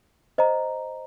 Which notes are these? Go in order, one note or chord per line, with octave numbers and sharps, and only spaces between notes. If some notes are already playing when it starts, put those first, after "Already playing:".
C5 D#5 A#5